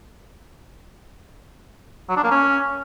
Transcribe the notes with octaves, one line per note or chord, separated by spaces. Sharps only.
F#3
D4
A#3
C#4